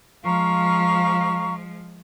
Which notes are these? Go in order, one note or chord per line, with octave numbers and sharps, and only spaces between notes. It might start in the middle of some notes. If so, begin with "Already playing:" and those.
F3 G#3 F5 A#5 C#6